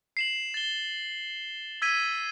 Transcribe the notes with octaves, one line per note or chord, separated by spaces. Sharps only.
C7 E7 F#7
A6 G7
E6 G#6 B6 D#7